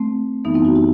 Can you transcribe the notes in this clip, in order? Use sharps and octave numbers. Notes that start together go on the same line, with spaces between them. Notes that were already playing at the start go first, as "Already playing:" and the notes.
Already playing: A3 C4
F#2 E3 G3 B3 D#4
C4 E4
D#4 F#4
E4 G4